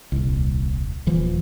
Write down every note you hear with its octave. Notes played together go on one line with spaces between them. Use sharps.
D#1 C2
D#1 E3 F3